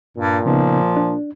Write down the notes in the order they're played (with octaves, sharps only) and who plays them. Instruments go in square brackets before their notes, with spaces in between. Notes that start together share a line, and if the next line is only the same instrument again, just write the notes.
[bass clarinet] G2 [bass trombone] A#2
[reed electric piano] C#3 B3 D#4 [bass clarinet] F3
[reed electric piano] D4